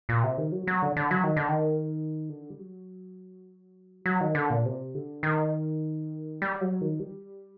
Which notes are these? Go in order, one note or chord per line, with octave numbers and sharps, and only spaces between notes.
A#2
C3
D#3
F#3
F#3
D3
D3
F#3
D#3
D3
D#3
D3
G3
F#3
F#3
D#3
D3
A#2
C3
D3
D#3
G3
F#3
D#3
G3